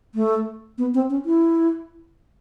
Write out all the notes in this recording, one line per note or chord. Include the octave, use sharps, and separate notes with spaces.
A3
B3
C4
C#4
E4